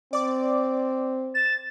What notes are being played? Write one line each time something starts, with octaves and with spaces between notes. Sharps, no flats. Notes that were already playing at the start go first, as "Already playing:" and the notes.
C4 D5 D6
A6 E7